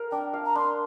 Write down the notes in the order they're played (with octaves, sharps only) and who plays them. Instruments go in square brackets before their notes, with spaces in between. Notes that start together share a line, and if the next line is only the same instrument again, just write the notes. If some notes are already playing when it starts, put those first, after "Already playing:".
Already playing: [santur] A#4 F5
[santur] D4 [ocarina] G5
[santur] F5
[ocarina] A#5
[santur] D4 [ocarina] C6